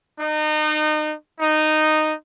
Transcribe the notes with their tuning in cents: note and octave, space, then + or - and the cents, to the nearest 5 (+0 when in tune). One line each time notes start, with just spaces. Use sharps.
D#4 -30
D#4 -10